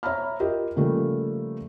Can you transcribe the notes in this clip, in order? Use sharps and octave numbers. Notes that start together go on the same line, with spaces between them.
C#5 E5 A#5 B5 F6
F4 G4 A#4 D#5
C#3 F3 G3 A3 A#3